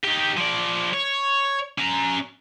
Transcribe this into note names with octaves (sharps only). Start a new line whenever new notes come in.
D#4 G4
F3 D5
C#5
C#4 A#5